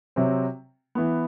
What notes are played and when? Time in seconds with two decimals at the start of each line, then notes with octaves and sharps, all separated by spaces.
0.16 C3 F#3 C4
0.95 E3 B3